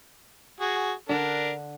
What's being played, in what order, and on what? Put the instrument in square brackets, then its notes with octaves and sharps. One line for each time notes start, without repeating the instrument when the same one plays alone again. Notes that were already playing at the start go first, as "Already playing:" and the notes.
[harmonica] F#4 G#4
[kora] D3 [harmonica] D4 A#4